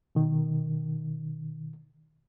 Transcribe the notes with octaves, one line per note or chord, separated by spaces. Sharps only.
B2 D#3